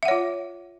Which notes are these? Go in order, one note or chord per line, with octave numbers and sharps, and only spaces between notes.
F4 C#5 E5 F#5